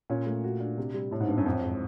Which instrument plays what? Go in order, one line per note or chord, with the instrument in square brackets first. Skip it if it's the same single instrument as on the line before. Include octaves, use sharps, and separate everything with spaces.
[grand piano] A#2 [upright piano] C#4
[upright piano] A3
F#4
D4
C3
G3
[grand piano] A2 [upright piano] E4
[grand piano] G#2
[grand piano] G2 [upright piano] B3
[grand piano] F#2
[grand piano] F2 [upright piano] C4
[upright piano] G#3